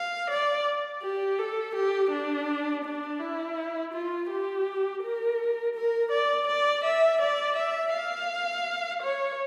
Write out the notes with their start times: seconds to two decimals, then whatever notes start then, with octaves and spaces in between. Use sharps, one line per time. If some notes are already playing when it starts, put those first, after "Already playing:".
Already playing: F5
0.30 D5
1.03 G4
1.38 A4
1.75 G4
2.11 D4
2.84 D4
3.20 E4
3.93 F4
4.30 G4
5.02 A#4
5.75 A#4
6.11 D5
6.47 D5
6.84 E5
7.21 D5
7.56 E5
7.93 F5
9.02 C#5